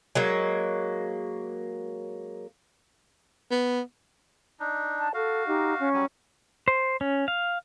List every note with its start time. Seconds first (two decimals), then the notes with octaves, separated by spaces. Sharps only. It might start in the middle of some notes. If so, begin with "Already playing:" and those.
0.15 F#3 G#3 A#3
3.51 B3
4.60 D4 D#4
4.98 A5
5.14 F#4 A4 F5
5.47 D#4 G4 D#5
5.79 C#4 C#6
5.94 F#3 G3 G#5
6.68 C5
7.01 C#4
7.28 F5